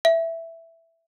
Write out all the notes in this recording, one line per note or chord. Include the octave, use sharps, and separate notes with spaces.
E5